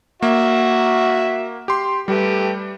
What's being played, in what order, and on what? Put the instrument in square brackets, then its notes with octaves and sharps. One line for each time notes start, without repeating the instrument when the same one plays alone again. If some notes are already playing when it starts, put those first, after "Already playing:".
[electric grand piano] A#3 [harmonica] F#4 E5
[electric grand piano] G4 C6
[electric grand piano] G3 [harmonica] A3 G4 B4